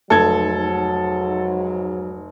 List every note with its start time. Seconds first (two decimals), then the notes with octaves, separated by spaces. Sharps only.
0.10 F1 G#2 F#3 A4 G#6